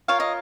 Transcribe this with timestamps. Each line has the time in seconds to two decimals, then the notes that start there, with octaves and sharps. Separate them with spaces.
0.08 F4 A#4 C#5 F5
0.20 D#5